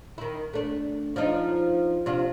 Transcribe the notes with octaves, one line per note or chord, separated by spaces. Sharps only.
D#3 E4
A3 D4
F3 D4 D#4
C3 D4 F4